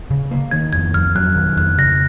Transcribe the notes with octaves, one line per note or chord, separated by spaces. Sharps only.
C#3
A#3
D#3 G#6
F2 G#6
F2 F6
F#3 F#6
D#3
F2 F#6
C#3 A#6